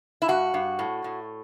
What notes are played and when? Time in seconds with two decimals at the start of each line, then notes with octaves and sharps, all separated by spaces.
0.22 E4
0.28 G2 F#4
0.54 G2
0.79 A2
1.04 A2